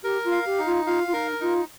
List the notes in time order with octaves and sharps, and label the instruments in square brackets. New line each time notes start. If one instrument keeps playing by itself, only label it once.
[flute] G4 [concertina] A#4
[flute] F4
[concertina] F5
[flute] G4
[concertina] D#4
[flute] F4
[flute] F4 [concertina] F5
[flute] F4
[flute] D#4 [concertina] A#4
[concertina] D#4 [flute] F4